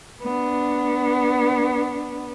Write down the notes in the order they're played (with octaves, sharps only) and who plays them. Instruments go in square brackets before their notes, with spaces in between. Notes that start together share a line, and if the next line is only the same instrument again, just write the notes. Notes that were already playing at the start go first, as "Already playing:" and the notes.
[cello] B3 D4